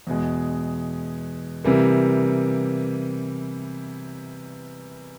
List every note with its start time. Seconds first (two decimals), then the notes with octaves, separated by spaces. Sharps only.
0.07 E2 B2 G#3
1.65 C3 E3 G3 A#3